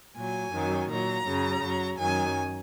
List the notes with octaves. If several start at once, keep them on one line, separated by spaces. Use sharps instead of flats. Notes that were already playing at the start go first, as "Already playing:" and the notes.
A#2 F#3 G#5
F#2 D#3 F#3
A#2 F#3 A#5
F#2 C#3 F#3
F#2 F#3
F#2 D#3 F#3 G#5